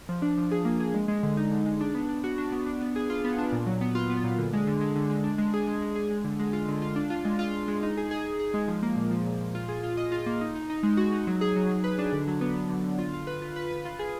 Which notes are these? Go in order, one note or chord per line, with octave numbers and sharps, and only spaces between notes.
F3
D4
F3
G#4
A#3
G#4
G#3
G#3
D3
D#4
D3
G#3
D4
B3
D4
F#4
D4
B3
D4
B3
G#4
F4
B3
D4
A#2
F#3
B3
F4
B3
A#2
D3
G#3
D3
G#3
D3
G#3
D4
G#3
G#4
G#3
G#3
G#4
G#3
D3
G#3
F4
D3
F4
D4
F4
G#3
F4
F4
G#3
D#4
G#4
G#4
G#4
G#4
G#3
F3
A#3
A#2
F3
A#2
A#2
F4
G#4
F4
D#5
F4
A#3
D#4
D#4
D#4
G#3
F#4
D#4
F#3
G#4
F#3
F#3
B4
D4
D3
F#3
B3
B3
D3
D3
F4
F4
B4
F4
B4
B4
F4
G#4